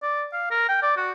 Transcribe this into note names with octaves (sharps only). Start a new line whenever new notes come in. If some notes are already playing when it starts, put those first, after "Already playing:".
D5
F5
A#4
G5
D5
F#4